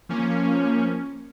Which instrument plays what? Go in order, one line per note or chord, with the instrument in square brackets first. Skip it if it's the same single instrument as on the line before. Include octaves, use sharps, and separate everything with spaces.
[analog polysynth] F3 A#3 C#4